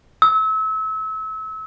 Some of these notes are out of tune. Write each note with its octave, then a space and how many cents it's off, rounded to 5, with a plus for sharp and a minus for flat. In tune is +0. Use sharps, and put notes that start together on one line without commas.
E6 -30